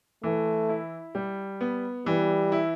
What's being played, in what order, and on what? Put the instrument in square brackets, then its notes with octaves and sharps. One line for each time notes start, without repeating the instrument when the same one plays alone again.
[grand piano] E3 [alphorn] A3
[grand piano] E4
G3
B3
[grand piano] E3 [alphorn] G3
[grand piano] E4